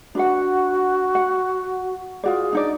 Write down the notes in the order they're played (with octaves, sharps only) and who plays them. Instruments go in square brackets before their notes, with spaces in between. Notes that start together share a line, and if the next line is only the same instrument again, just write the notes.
[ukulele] D4 B4 F#5 [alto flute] F#4
[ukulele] F#5
[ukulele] F4 F#4 D5 [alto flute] G#4
[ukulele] D4 D#4 D5